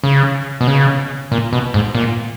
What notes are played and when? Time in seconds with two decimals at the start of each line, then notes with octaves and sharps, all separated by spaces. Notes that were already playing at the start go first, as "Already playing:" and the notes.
0.04 C#3
0.61 B2
0.67 C#3
1.32 A#2
1.53 B2
1.74 G#2
1.95 A#2